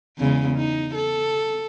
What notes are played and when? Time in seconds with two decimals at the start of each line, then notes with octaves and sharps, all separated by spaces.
0.18 E2 C#3 G#3
0.56 D#4
0.95 A4